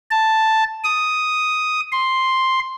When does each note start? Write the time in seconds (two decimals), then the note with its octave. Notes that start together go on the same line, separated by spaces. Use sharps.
0.11 A5
0.84 D#6
1.92 C6